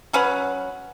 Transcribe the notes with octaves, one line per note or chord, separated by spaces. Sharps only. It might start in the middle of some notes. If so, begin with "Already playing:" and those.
F#3 C#4 B4 F#5